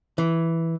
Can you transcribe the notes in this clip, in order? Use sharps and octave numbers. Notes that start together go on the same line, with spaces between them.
E3